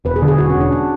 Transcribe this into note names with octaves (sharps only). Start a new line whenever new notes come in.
E1 B4
G#4
D3
G#4
E1 F#4
C#4
E1
D4
D4